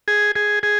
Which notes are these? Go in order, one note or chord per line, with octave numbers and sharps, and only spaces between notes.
G#4
G#4
G#4